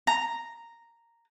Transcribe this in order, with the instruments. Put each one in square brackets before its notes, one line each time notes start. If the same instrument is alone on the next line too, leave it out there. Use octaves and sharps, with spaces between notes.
[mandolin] A#5